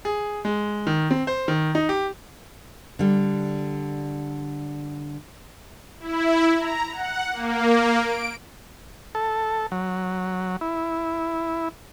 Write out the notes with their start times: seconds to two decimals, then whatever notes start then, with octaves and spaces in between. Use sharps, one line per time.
0.05 G#4
0.45 G#3
0.87 D#3
1.11 C4
1.27 C5
1.48 D#3
1.75 D#4
1.89 G4
2.99 D3 G3
6.00 E4
6.58 A#5
6.92 F#5
7.32 A#3
7.99 D7
9.15 A4
9.72 F#3
10.61 E4